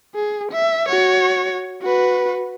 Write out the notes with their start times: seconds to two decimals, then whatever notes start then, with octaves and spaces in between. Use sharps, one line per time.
0.15 G#4
0.52 E5
0.89 F#4 C#5
1.82 F#4 B4